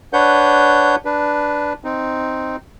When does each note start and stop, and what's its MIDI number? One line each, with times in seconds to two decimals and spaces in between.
0.13 0.96 62
0.13 0.96 71
0.13 0.96 73
0.13 0.96 78
0.13 0.96 91
1.05 1.73 62
1.05 1.73 71
1.84 2.56 60
1.84 2.56 63